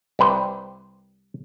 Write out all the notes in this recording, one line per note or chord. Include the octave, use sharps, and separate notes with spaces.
C2 G4 B4 C5